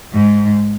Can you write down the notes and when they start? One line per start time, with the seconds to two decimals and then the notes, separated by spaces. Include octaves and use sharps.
0.13 G#2